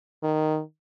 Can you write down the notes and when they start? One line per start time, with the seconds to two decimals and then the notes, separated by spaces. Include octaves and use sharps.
0.23 D#3